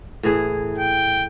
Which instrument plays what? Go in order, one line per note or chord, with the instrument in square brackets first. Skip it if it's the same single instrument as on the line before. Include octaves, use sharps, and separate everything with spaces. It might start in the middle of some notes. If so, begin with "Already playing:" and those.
[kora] A2 E3 G#4
[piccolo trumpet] G5